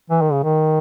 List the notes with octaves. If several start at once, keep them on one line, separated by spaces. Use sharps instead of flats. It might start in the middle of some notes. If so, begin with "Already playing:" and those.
E3
D#3
C#3
D#3